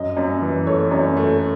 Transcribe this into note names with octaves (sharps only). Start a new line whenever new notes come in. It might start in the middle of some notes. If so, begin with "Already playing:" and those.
Already playing: F#2 D#5
F#2
E3
A3 C#5
F#2
A3